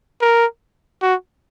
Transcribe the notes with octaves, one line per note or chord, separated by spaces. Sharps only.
A#4
F#4